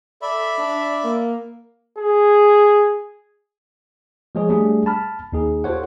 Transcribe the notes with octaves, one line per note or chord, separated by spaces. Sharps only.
A4 D5 E5 B5
D4
A#3
G#4
F3 G#3 G#4 C#5
G3 A3 D4 G#4
A5 B5 F6
D#2 D#4 G#4
F4 G4 A4 C5 C#5 F#5